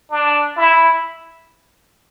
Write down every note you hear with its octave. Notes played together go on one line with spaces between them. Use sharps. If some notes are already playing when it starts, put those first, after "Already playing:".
D4
E4